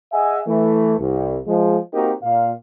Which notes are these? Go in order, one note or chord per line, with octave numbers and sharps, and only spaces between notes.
G#4 D#5 E5 F#5 G#5
E3 A3
C2
F3 G#3
A#3 C4 D#4 F#4 G4 A#4
A#2 F5